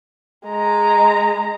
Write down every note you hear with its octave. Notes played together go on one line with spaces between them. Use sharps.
G#3 A#5